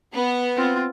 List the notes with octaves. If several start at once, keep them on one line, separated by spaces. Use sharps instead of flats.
B3
C4 F4